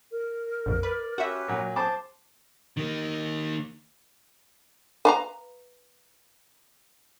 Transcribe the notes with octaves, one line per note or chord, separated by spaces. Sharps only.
A#4
A#1 F2
B4 D5
C#4 F#4 G4 B4 E5
A#2 F#3
G#4 C5 A5 D6
D#3 A#3
B4 F5 A#5